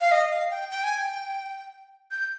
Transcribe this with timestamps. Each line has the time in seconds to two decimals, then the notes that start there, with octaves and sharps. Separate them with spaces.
0.01 F5
0.12 D#5
0.31 F5
0.51 G5
0.71 G5
0.84 G#5
0.98 G5
2.11 G6